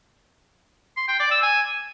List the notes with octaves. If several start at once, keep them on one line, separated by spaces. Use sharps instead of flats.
C6
G5
D5
E6
G#5